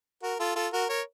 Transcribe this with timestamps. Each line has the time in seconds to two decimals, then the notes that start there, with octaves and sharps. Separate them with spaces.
0.22 F#4 A#4
0.39 F4 A4
0.56 F4 A4
0.73 F#4 A#4
0.89 A#4 C#5